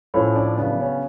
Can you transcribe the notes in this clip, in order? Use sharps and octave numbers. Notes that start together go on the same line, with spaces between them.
A2 F3 A3 C#4 C#5
D4 D5
C#3 F#3 B3 D4 D5
C#4 C#5